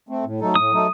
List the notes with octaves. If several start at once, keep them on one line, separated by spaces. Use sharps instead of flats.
A3 C4
A2
F#3 A3 D#4 A4
A2 D#6
F#3 A3 D#4 A4